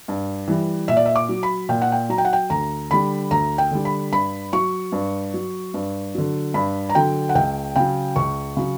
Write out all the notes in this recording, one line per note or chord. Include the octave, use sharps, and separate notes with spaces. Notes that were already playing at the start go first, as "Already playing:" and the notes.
G2
E3 G3
A#2 E5
D5
E5
D6
F#3
B5
A#2 G5
F#5
G5
F#3 A#5
G5
F#5
G5
D2 A#5
D3 G3 B5
D2 A#5
G5
D3 G3
B5
G2 B5
F#3 C#6
G2
F#3
G2
D3 F#3
G2 B5
A#5
D3 F#3 G5
F#5
C#2 G5
C#3 F#3 G5
C#2 C#6
C#3 F#3